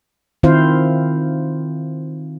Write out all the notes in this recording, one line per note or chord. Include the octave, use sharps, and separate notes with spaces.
D#3 C4 E4 F4 C5 F5